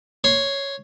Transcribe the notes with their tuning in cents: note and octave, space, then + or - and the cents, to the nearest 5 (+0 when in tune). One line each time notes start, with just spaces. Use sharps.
C#5 +0 C6 +0